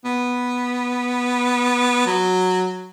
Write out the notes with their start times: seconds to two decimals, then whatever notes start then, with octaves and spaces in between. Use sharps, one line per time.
0.05 B3
2.06 F#3